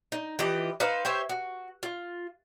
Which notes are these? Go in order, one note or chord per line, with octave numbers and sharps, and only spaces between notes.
D#4
E3 F3 G4 D#5
D#4 B4 C5 F5
G4 C5 C#5 E5
F#4
F4